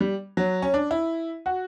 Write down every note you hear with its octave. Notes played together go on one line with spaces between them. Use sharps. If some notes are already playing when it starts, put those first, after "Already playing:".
G3
F#3
C#4
D4
E4
F#4